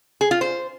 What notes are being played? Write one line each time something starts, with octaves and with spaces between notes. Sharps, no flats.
G#4
F4
C5